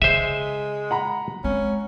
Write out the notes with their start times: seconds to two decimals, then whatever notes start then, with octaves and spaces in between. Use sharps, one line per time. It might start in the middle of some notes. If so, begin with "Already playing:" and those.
0.02 C#3 G#3 C5 E5 D#7
0.91 F#5 A#5 B5
1.44 G#3 C4 C#4